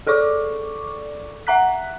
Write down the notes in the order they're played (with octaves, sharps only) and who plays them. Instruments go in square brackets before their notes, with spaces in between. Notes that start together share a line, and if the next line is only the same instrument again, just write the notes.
[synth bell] G#4 A4 D5 C#6 D6
E5 F#5 A#5 F#6 B6